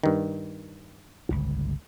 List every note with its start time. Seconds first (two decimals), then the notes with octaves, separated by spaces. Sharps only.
0.04 G2 D#3
1.30 G1 C#2